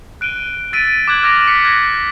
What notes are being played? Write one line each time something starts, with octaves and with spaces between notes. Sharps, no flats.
F#6 D7 D#7 G7
E6 A6 B6 D7 D#7
D6 F#6 G#6 F#7
F6 G#6 A#6 D7 F7
D6 F#6 A#6 B6 C#7
F#6 G#6 A#6